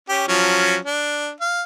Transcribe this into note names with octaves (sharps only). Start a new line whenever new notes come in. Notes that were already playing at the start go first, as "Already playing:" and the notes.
C#4 G4
F3 F#3 C#4
D4
F5